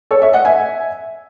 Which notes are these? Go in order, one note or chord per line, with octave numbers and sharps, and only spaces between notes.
A4 C#5
C#5 E5
D#5 F#5
E5 G#5